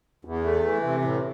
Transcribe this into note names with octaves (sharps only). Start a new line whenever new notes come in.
E2
A3
E3
C3
A2